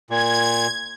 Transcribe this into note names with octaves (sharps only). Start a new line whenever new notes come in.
A#2 G#6